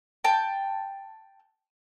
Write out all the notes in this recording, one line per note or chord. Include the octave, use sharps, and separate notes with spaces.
G5 A5